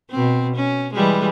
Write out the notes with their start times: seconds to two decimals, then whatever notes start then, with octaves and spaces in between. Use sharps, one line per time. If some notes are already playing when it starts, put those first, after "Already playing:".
0.11 B2 C4
0.56 C#4
0.94 E3 G3 G#3